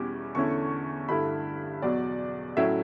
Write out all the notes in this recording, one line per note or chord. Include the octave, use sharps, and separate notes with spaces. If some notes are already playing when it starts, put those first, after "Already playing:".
Already playing: E2 B2 G3 C#4 E4 D6
E2 D3 A3 C#4 E4 C#6
G2 D3 A3 E4 B5
E2 B2 F#3 D5
A2 F#3 A3 C#4 E4 E5